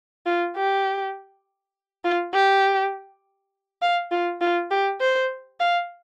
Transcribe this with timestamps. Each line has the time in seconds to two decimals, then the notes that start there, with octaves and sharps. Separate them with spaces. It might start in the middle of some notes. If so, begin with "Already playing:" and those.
0.26 F4
0.56 G4
2.04 F4
2.34 G4
3.82 F5
4.11 F4
4.41 F4
4.71 G4
5.00 C5
5.60 F5